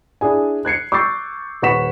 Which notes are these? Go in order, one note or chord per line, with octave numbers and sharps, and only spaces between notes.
D4 E4 G#4 G#5
F#6 G#6 C7 C#7
C#6 D6 E6 G6 A6 C7
D#1 B4 F#5 C#6 B6 E7